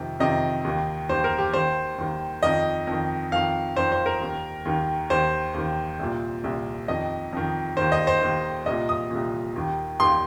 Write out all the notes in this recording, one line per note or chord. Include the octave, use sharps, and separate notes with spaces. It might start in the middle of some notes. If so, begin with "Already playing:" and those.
Already playing: F2 C3 D#3
F2 C3 D#3 D#5
D#2 D#3
D#2 D#3 C5
A#4
G4
D#2 D#3 C5
D#2 D#3
F2 D#3 D#5
F2 D#3
F2 D#3 F5
F2 D#3 C5
C5
A#4
D#2 D#3
D#2 D#3
D#2 D#3 C5
D#2 D#3
C2 A#2
C2 A#2
F2 D#3 D#5
F2 D#3
D#2 D#3 C5
D#5
C5
D#2 D#3
C2 A#2 D#5
D#6
C2 A#2
D#2 D#3
D#2 D#3 C6